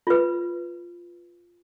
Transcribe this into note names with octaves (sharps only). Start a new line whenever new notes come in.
F4 B4